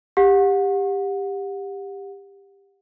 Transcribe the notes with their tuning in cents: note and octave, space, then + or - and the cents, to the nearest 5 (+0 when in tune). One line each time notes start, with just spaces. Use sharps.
G4 +15 F#5 -30